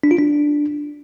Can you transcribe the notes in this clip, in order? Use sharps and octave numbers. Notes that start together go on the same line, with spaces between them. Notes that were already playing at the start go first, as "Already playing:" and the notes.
D4
F4
D4